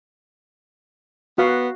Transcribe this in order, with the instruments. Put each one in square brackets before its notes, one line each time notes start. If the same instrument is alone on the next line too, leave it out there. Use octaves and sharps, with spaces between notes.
[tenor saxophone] B3 [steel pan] F#4 F5